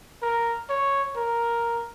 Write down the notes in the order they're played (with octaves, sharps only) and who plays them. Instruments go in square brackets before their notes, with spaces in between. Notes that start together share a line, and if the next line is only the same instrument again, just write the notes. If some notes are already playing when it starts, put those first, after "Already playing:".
[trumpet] A#4
C#5
A#4